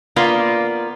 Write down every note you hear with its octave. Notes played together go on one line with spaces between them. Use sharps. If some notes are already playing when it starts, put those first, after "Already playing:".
A#3 B3 F4 D5